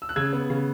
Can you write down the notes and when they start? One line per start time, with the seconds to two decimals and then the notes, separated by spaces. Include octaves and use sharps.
0.02 E6
0.09 F#6
0.16 C#3 E6 G#6
0.33 B3
0.50 C#3